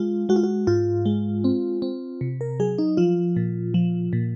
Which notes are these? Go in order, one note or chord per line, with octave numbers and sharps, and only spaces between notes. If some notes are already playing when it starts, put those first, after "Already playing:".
Already playing: G#3 F4
G#3 F#4
F4
F#4
G#2 F4
G#3
C4
C4
C3
A#4
F#3 G#4
D#4
F3 F4
A#2
F3
A#2